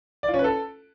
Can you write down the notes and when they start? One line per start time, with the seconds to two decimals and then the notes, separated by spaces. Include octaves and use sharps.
0.23 D5
0.28 F4
0.34 C#4
0.39 B4
0.44 A4